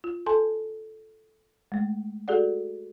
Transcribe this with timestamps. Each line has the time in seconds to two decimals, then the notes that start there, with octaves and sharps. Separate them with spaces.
0.04 F4
0.26 A4 G#5 A5 C6
1.72 G#3 A3
2.28 F#4 G#4 A4 D5 F#5